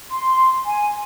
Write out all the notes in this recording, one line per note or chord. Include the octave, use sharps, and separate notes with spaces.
C6
G#5